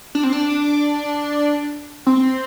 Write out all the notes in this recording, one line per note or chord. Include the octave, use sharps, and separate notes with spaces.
D4
C4
D4
C4